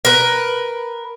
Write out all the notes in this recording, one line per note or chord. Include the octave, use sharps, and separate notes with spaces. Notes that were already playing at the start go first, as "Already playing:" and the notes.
A#4 B4